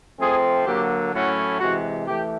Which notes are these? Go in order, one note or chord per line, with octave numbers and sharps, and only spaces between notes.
F3 A3 C4 G#4
D3 F#3 A#3 G4
A2 F#3 A3 C#4 E4 F#4
C3 E3 G#3 F#4
E3 A3 G4